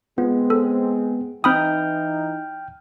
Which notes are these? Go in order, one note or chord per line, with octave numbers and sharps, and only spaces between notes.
G#3 B3 C4 F4
A4
E3 C4 D#4 G5 B5 D#6 F6 G6